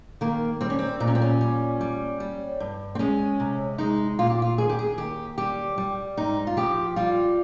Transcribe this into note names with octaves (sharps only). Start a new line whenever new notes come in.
D#3 A#3
G3 C4
C#4
C4
A#2 D#4
C#4
C4
C#4
G3
G3
G3
G2
C4
G#3 C#4
C3
G#3 D#4
A#2 F4
G4
F4
D#2 G#4
G4
G#4
D#2 G4
G3 G4
G3
G#2 D#4
F4
F3 G4
G3 F4